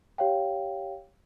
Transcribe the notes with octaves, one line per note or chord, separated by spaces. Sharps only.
G4 C#5 F5 G5